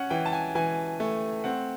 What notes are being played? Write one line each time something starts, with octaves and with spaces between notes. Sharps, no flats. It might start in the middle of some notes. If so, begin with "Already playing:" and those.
Already playing: C#4 F#5
E3 G5
A5
G#5
E3 G#5
A3
C4 F#5